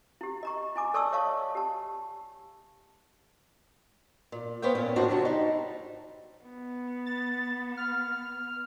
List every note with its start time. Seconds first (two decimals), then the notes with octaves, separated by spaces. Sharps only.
0.21 E4 G4
0.43 D#5 A#5 C#6
0.76 E4 G#5 D6
0.94 A4 D5 A5 C#6 D6 E6
1.12 C#5 D#5 F5 A5 C#6
1.55 G4 A5
4.32 A#2
4.62 B3 C5 C#5 F5 G5
4.75 A#2 C#4
4.96 F2 A2 D4 F#4 C5 C#5
5.08 C3 F3 F#3 A5
5.25 G3 D#4
6.44 B3
7.06 A6
7.77 F6